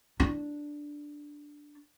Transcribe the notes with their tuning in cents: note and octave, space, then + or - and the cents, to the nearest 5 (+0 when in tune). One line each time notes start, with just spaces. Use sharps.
D4 +0